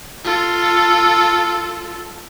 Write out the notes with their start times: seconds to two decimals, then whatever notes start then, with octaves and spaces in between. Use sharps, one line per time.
0.24 F4 A4